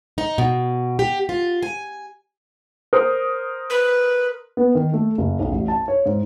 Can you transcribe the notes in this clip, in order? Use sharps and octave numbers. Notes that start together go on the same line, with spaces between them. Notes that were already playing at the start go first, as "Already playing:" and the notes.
D#4
B2
G4
F4
G#5
A#4 C5 D#6
B4
B3
D#3
A3
F#1
B1
A1
A5
C#5
G#2